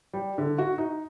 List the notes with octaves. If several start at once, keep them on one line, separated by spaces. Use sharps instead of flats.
G3
D3
F#4
D#4